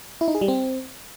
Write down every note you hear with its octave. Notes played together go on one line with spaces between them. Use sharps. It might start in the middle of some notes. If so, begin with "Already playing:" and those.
E4
D#4
G#4
G3
C4